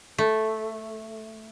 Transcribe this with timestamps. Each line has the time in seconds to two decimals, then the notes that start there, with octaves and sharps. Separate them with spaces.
0.18 A3